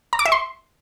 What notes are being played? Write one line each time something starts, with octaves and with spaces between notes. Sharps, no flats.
A#5
D6
E5
C6